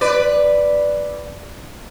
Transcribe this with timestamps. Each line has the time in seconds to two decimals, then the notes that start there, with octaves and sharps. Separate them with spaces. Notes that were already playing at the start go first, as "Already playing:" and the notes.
0.01 B4 D5